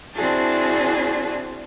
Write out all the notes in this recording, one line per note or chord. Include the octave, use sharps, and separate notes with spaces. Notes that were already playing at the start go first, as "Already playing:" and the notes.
C4 D4 E4 F#4 G#4 A5